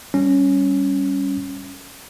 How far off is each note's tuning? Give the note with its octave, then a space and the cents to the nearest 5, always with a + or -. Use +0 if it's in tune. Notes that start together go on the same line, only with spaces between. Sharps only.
G3 +0 C#4 +0